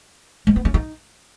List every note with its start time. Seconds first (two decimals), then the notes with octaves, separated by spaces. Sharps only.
0.47 G#3
0.56 B3
0.65 C#4
0.74 D#4